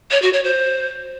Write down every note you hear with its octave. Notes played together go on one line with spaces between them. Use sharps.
C#5
F#4
C#5
C5